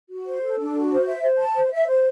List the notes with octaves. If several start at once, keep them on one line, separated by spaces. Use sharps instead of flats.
F#4
C5
A4
D4
F#4
C5
E5
C5
A5
C5
E5
C5